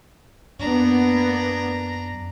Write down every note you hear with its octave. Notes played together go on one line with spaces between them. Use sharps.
F#2 A#3 B3 D4 A#5